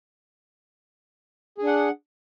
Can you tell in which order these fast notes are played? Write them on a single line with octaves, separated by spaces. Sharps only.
G#4 D4 F#5